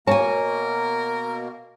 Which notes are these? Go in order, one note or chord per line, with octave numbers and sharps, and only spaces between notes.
B2 A#3 A#4 C#5 G#5 A5